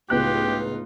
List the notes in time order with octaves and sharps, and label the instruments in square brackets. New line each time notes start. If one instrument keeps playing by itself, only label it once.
[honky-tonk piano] C#2 B3 F#6 [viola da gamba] A2 D#4 F4 [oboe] G4